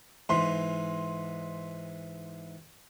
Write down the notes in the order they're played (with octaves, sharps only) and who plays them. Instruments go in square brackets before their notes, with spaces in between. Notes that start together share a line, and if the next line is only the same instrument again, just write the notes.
[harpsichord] G#2 E3 [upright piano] C6